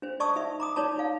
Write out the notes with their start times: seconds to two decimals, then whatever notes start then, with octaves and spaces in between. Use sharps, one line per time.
0.02 D4 C5
0.20 D5 D#5 A5 C#6 D#6 E6
0.36 D#4 E5
0.60 A#5 D6 D#6
0.76 D#4 C#5 D5 A5 A#5
0.98 D#4 F5